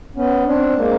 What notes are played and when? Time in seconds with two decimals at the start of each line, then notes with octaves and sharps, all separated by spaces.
0.16 B3 C#4
0.47 C4 D4
0.78 G#3 A#3